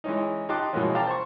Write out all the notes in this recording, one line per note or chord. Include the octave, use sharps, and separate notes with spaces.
E3 G#3 C#4 D#4
D#4 G4 A5 C6 D6 F#6
B2 E3 F3 G#3 A#3 C#4
F5 G5 A5 A#5 D6
C5 C#6